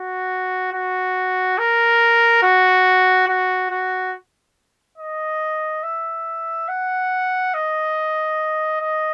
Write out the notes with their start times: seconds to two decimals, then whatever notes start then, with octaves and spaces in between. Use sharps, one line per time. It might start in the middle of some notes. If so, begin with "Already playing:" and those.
Already playing: F#4
0.73 F#4
1.58 A#4
2.43 F#4
3.28 F#4
3.70 F#4
4.98 D#5
5.83 E5
6.68 F#5
7.54 D#5
8.81 D#5